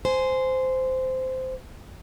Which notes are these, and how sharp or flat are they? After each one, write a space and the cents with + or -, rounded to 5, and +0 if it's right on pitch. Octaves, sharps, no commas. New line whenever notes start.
C5 -15 G#5 +10